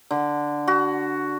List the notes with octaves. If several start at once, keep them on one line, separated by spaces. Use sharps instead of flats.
D3
F#4